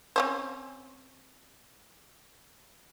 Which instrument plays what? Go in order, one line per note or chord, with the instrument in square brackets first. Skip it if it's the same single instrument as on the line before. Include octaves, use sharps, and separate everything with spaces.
[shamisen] C4 C#4 C5